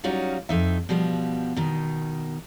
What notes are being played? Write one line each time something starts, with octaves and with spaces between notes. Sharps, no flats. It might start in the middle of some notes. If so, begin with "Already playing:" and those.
F#3 G3 C#4 D#4 F4 F#4
F2 D#4 E5
B2 F3 G3 B3
B2 D#3